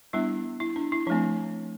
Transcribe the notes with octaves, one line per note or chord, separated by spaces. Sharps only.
G3 B3 D4 E4
E4
D4
E4
F3 A3 C4 D4